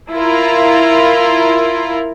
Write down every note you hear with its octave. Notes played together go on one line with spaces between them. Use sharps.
E4 F4 A#4